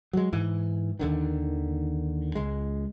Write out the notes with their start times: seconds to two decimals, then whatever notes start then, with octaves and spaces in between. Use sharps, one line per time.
0.13 F#3 G#3
0.33 G#2 E3
0.99 D#2 D3 D#3
2.35 C#2 G#3